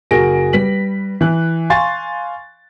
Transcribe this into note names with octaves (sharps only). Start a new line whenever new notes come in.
F#1 F#4 G#4 A#4 A#6 D7
G3 B4 B6 F#7
E3 F#6
F5 G#5 C6 C#6 A6